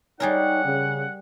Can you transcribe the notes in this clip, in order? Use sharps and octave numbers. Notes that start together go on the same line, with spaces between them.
G3 D#4 G#4 A#4 C#5 F#5
C#3